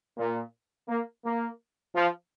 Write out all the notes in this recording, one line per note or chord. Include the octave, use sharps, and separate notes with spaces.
A#2
A#3
A#3
F3